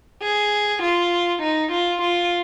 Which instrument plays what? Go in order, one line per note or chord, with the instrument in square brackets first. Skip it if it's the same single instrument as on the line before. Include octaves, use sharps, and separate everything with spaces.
[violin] G#4
F4
D#4
F4
F4